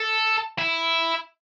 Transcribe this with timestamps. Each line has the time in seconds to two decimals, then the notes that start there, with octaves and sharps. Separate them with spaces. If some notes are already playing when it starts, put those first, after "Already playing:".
Already playing: A4
0.58 E4